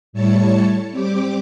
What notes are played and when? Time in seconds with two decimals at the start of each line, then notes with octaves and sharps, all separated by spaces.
0.13 A2 G3 E4 C#5 A5 C#7
0.91 G3 C4 G4 D6